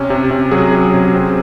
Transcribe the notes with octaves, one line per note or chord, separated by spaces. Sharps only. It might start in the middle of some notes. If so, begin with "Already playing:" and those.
Already playing: C3 C#4
C3
C3
F#3 G#4
C#4
C3
C4